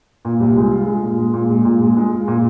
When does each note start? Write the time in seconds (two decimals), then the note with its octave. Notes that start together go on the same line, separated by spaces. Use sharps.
0.25 A#2
0.40 C2
0.56 G#3
0.71 F4
0.87 G#3
1.02 A#2
1.18 G#3
1.34 A#2
1.50 G#3
1.65 A#2
1.81 G#3
1.97 G#3
2.13 F4
2.28 A#2